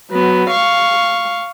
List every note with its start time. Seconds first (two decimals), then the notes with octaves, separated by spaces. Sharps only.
0.11 F#3 B3
0.50 F5 C#6